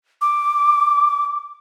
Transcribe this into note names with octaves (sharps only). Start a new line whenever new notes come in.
D6